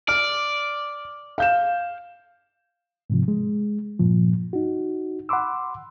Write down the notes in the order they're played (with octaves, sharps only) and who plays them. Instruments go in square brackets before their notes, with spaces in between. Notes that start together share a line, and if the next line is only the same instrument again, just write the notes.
[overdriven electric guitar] D5 [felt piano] F6
[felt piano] F5 G6 E7
[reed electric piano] G#2 C3 F3
G#3
G2 A#2 F3
D#4 F#4
F#5 B5 C6 D6 E6